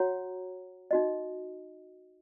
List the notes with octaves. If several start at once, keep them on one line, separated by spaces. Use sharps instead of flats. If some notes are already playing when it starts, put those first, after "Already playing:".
Already playing: F#4 C#5 F#5 A#5
D#4 F#4 D#5